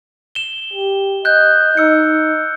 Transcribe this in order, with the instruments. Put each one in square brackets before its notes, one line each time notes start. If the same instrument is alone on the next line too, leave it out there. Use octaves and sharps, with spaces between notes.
[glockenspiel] E7 G7
[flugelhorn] G4
[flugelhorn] D#5 [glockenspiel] F#6 G6
[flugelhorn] D#4 [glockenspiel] E6 C#7